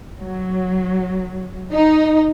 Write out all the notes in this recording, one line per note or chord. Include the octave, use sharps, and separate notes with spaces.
F#3
D#4